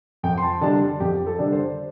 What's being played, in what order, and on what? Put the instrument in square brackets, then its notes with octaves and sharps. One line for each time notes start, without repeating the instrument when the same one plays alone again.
[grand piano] F2 G5
C6
A5
D3 G3 D4 A5
F2 G4
A4
D3 G3 D4
C5